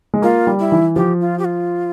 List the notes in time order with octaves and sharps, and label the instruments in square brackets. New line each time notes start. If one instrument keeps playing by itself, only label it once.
[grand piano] G#3
[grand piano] A#3 [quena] F4
[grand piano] G3
[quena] E4
[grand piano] E3
[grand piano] F3 [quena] G4
[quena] F4
G4
F4